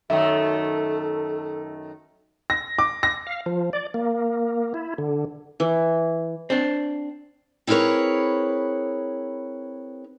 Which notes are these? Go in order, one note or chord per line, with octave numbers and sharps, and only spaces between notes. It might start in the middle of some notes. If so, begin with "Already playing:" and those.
F#2 D#3 A3 A4 E5
A#6
D6
A#6
F5
F3
D5
A#3
E4
D3
E3
C4 D4
C4 E4 G#4 A#4 B4 C#5